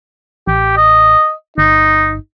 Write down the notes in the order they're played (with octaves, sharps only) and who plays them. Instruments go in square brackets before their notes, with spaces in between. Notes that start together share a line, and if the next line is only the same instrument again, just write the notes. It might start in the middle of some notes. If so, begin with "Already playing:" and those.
[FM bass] A1 [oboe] G4
[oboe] D#5
[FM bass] G1 [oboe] D#4